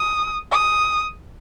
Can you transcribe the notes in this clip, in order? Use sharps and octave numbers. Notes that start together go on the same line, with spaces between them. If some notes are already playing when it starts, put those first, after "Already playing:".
Already playing: D#6
D#6